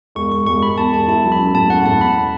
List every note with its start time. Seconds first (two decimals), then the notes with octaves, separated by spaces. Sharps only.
0.15 E1 C#6
0.31 E1 C#6
0.46 E1 C#6
0.62 E1 B5
0.78 E2 A5
0.93 E1 A5
1.08 E4 A5
1.24 F#3
1.32 B5
1.39 C#4
1.55 A2 A5
1.70 C#4 F#5
1.85 A2 A5
2.01 B2 B5